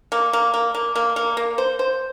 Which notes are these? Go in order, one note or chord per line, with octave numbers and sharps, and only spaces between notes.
A#3
A#3
A#3
A#3
A#3
A#3
A#3
C5
C5